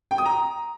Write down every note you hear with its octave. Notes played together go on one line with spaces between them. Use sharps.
G5
D#6
A#5